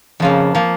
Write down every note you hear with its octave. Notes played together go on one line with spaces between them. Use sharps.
F2 C#3 F3 A#3
F3 A#3